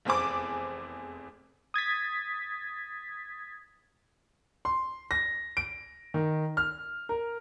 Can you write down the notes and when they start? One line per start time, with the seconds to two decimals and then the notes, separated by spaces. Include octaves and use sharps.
0.05 F1 E2 C4 G#4 D6
1.74 D#6 G#6 A6 B6
4.65 C6
5.11 A#6
5.57 D7
6.14 D#3
6.57 F6
7.09 A#4